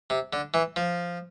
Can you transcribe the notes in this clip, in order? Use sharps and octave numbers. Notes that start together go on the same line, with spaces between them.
C3
D3
E3
F3